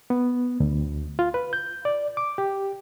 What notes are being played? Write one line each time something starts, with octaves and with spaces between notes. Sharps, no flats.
B3
D2
F4
B4
G6
D5
D6
G4